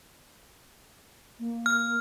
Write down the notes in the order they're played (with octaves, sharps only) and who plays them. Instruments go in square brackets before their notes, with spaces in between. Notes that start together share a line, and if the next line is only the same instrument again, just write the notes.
[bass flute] A#3
[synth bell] F6